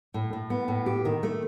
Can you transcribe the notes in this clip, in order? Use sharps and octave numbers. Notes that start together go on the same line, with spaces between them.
A2
A2
B3
A2
G4
D#3
A3